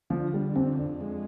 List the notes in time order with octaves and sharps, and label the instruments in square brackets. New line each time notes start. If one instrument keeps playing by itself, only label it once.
[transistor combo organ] D3 [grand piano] F3
[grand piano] G3
[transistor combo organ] F2 [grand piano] C4
[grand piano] D4
[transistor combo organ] G#3